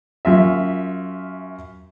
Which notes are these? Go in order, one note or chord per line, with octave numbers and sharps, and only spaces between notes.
F#2 F4 E5